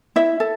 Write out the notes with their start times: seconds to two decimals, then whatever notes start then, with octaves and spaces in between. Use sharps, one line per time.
0.16 E4 E5
0.40 A4